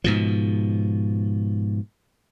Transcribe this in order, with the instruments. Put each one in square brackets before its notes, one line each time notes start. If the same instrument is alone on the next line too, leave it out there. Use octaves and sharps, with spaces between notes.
[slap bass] G#2 B2 F3